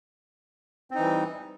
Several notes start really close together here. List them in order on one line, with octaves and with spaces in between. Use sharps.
C4 D#4 E3 G3